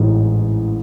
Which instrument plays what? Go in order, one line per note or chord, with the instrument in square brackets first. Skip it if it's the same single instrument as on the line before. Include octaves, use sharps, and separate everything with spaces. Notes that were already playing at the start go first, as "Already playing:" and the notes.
Already playing: [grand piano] A1 G#2 E3